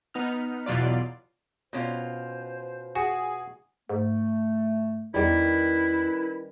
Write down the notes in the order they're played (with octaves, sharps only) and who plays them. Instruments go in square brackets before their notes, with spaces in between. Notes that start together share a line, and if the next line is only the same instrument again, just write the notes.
[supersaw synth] B3 D#4 F6
E2 B2 F#3 F4 D5
[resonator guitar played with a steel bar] B2 C#4 F4 [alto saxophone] C5
[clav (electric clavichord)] F#4 [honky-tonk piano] G#4
[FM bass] G#2 [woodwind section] A3
[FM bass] E2 [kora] D#3 G3 [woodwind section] C#4 A#4 B4 [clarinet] E4